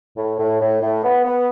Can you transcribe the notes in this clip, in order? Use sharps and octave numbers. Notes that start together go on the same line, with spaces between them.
A2
A2
A2
A2
B3
B3